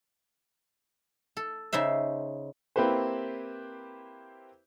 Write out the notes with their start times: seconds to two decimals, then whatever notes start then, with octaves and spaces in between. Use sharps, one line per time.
1.37 A4
1.73 C#3 D#4 C5 E5
2.76 A#3 C4 E4 G4 B4 C5